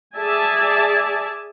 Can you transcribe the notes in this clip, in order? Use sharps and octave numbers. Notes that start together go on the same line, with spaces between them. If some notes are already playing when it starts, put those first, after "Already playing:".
G#4 D5 E5 G#5 A5